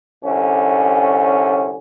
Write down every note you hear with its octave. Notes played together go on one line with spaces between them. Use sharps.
C2 D3 C#4